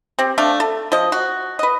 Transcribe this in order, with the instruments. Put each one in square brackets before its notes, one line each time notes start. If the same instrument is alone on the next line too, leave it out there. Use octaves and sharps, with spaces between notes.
[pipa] C4 G4
A3 D4 F5
A4
F3 D#5
F#4
B4 D#5